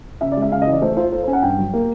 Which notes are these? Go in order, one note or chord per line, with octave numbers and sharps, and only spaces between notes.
C#3 E5
D5
G#3
E5
C#3 F5
D#5
E3
D5
A3 C5
F4 C5
A4 C5
C5
C#4
F#5
G2 G5
F#3
A#3